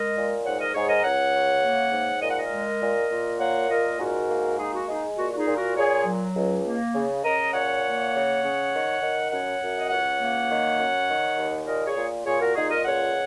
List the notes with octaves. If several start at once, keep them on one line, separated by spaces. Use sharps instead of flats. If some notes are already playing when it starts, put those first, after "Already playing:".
Already playing: G#3 A#4 D#5
A#2
G#2 C#5 F#5
A#4 D#5
G#2 G#4 C#5
A#4 D#5
C#2 C#5 F#5
C#3
A#3
G#2
A#2 D#5
F#5
A#4 D#5
G#3
A#2
A#2
A#3 C#5 F#5
A#2 A#4 D#5
G#2 F#4 A#4
A#3
G#3 D#4 G#4
F#4
G#3 D#4 G#4
A#2 F#4
F#4
D#4 G#4
A#2
F#4 A#4
A#2 G#4 C#5
F#3
C#2
A#3
C#3
C#3 A#4 D#5
A#2 C#5 F#5
A#3
C#3
C#3
D#3
D#3
F#2 C#5 F#5
F#2
D#5
C#2 C#5 F#5
A#3
D#3
F#2
D#3
D#2
A#2 A#4 D#5
G#4 C#5
A#2
A#2 G#4 C#5
F#4 A#4
A#2 D#4 G#4
A#4 D#5
C#2 C#5 F#5